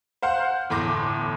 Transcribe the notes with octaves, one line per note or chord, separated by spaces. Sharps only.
C5 F5 F#5 C6
G1 E2 A2 C6 D6 A#6